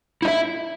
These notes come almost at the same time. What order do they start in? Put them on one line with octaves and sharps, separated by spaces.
E4 D#5 E5